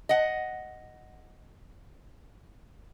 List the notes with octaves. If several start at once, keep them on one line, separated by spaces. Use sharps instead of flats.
D#5 F#5